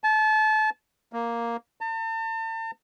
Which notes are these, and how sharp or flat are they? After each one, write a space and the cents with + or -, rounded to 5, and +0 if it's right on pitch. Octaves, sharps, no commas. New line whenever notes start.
A5 -30
A#3 +0
A5 +40